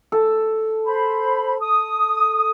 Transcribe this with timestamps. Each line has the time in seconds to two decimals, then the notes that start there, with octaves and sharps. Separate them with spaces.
0.12 A4
0.84 C5 B5
1.60 D#6